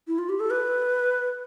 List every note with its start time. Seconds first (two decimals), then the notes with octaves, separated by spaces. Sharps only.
0.08 E4
0.18 F4
0.29 G4
0.40 A4
0.50 B4